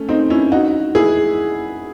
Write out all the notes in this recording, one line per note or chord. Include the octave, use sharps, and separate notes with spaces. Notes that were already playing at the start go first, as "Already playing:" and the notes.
Already playing: A3 C#4
C4 D#4
C#4 E4
D#4 F#4
E4 G#4